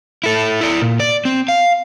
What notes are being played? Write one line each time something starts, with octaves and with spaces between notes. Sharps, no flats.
E4 A4
E4 D5
A#2
D5
C4
F5